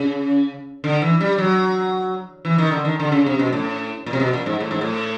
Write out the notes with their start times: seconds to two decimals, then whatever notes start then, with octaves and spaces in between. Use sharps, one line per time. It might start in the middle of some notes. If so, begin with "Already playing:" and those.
Already playing: C#3
0.84 D3
1.02 E3
1.21 G3
1.38 F#3
2.45 E3
2.58 D#3
2.72 D3
2.85 D#3
3.00 D3
3.12 C#3
3.26 C3
3.39 B2
3.53 A2
4.06 A#2
4.13 C3
4.20 B2
4.33 A#2
4.46 G#2
4.60 A2
4.71 G#2
4.81 A2